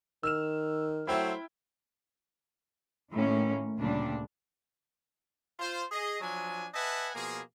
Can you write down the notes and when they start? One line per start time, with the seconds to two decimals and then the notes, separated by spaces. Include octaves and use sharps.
0.23 D#3 E6 F6 E7
1.07 F#3 A3 C4 E4 G5
3.10 A2 D#3 A#3 C#4
3.77 D2 A#2 C#3 G3 D4
5.59 F4 C5
5.92 G#4 D#5
6.21 F3 F#3 D4 G#5
6.74 B4 D#5 E5 F#5 G#5 A5
7.15 B2 F3 A#3 G#4